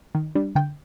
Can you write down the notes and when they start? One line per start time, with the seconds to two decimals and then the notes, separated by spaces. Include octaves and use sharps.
0.15 D#3
0.35 G3 D4
0.55 D3 G5